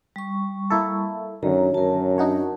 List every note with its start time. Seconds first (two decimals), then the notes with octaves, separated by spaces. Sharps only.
0.16 G3 C#6
0.70 A#3 E4 A4
1.43 F#2 D3 D#3 C#5 A#5
1.74 F#2 A#4 A5
2.18 D4 D#4 F#4 C#5